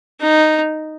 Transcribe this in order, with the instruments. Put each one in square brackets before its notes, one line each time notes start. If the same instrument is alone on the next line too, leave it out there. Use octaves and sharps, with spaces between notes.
[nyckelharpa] D#4